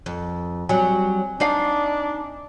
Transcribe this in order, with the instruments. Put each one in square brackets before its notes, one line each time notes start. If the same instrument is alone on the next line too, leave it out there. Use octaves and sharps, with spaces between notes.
[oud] F2
[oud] F#3 G3 [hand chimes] C4 G#5
[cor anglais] D4 [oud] D#4 D5 F5